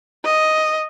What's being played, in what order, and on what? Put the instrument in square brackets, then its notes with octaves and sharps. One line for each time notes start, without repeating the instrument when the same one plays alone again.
[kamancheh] D#5